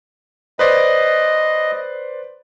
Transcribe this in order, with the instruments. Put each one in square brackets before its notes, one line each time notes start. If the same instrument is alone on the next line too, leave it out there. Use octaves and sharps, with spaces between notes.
[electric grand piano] B4 C5 D5 [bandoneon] D#5